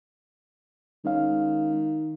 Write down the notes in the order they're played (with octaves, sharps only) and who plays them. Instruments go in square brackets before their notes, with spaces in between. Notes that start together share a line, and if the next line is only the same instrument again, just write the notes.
[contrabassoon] D#3 [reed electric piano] G#3 C#4 F5